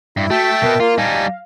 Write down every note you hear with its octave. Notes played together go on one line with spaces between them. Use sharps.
G2 E4
A3 F#4 E5 G5 A5
B2 B3 A#4
A#3 F4
G3 D#4 F5 G#5 A5